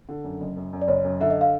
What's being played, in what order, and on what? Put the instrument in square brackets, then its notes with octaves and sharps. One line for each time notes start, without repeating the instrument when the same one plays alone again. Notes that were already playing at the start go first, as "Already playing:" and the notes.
[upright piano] D3
F#2
F#1
F#2
F#2
[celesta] D5
[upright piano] F#1 [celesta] C#5
[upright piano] F#2
[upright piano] D3 [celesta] E5
[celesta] D#5
F5